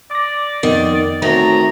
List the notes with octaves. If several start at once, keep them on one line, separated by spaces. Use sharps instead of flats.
D5 D6 A#6
F2 D#3 B3
D2 D#3 A3 C4 C#5 A#5